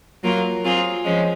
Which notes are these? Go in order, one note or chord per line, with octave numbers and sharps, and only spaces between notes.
F#3 A#3 F4 A#4
F#3 C4 F4 G#4
F3 G#3 C#4